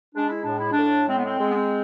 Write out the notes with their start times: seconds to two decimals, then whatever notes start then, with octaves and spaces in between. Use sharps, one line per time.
0.15 G#3 D4
0.29 E4
0.43 A2 D4
0.57 E4
0.71 D4
0.78 A2
1.08 G#3 C4
1.17 B3
1.25 C4
1.39 G#3
1.50 B3
1.55 C4